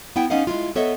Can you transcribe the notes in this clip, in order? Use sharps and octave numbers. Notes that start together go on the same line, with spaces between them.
B3 E4 F#5 G5
B3 C#4 D#4 D#5 F5 F#5
G#3 E4 F4
B3 A4 C#5 D#5 E5